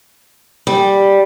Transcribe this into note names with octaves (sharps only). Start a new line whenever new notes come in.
G3